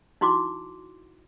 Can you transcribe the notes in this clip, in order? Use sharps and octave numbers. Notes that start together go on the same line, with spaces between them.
D#4 E4 F#4 C6 D6